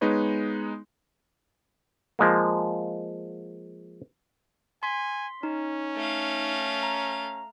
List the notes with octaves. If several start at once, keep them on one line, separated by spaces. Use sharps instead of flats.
G#3 B3 D#4 B4 C#5
F3 G#3 A#3
G#5 C6 B6
C#4 D#4
A3 F5
A#5